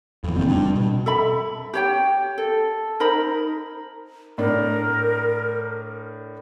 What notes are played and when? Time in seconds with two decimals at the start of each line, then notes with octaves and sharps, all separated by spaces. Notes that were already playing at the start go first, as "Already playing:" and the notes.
0.24 F2 E3
0.35 F#1 A#2 C4
0.49 G3 D4
0.75 B2
1.06 A4 E5 B5
1.74 G4 C#5 G5
2.38 A4
3.00 D#4 A#4 C5 B5
4.38 A2 D4 A#4